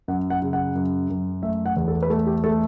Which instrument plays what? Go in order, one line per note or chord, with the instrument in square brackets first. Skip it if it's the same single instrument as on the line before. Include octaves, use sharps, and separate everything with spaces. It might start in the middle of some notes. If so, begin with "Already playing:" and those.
[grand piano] F#2 F#5
F#5
C#3
F#5
F#2
F#2
A3 E5
F#5
E2
A4
B4
A3 A4
G4
A3 A4